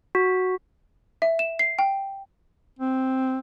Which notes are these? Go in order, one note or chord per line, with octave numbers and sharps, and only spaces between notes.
F#4
E5
E7
C7
G5
C4